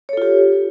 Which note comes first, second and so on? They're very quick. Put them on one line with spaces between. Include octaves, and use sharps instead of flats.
C#5 A4 F4 G4